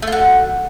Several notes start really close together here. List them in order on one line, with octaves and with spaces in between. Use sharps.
A3 F4 F#4